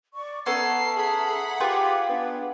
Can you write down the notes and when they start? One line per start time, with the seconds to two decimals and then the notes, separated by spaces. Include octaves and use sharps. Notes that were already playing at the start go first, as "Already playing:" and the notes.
0.14 D5 C#6
0.46 B3 C#4 A4 E5 A5 A#5 C7
0.97 G#4 F#5 B5
1.60 F4 G4 G#4 B4 F5 G5 D6
2.09 B3 D4